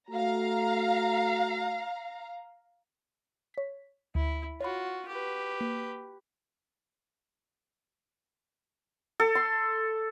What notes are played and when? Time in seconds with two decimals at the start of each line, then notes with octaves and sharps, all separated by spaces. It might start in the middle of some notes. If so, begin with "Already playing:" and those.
0.10 A3 F#4 F5 A#5
3.54 C#5 B6
4.15 D2 E4
4.61 F4 F#4 C#5 B5
5.08 G4 B4
5.61 A#3 B6
9.20 A4
9.35 C6